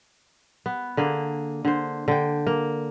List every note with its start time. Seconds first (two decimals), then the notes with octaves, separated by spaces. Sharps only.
0.66 B3
0.97 D3 A#3 G#4
1.65 D3 C5
2.08 D3 G5
2.47 A#3